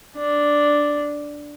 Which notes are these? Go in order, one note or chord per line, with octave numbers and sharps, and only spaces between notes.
D4